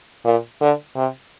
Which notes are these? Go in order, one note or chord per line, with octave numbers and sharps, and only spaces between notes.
A#2
D3
C3